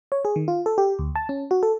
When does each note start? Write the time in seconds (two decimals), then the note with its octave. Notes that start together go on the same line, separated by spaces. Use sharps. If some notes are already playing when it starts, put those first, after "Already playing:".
0.12 C#5
0.25 G#4
0.36 D#3
0.48 F4
0.66 A4
0.78 G4
0.99 D2
1.16 A5
1.29 C#4
1.51 F#4
1.63 A4